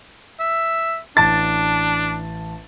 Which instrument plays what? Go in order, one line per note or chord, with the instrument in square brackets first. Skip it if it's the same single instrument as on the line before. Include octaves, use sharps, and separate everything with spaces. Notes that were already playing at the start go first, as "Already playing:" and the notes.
[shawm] E5
[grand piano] A1 A5 A6 [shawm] D4